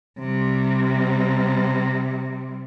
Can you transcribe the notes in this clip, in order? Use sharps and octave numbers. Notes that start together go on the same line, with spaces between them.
C3 G3